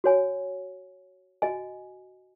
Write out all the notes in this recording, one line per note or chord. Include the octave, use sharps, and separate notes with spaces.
F#4 C#5 G#5
F#4 D#5 G#5